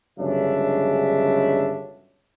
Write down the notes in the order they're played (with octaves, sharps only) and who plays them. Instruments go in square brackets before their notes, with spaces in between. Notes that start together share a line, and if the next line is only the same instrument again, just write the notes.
[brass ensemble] G1 C#3 F#3 G#3 D4 E5